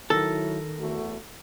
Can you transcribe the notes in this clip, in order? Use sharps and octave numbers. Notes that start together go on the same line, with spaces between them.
D#3 F#3 E4 A4 A#4 A#6
E2 A3 F#4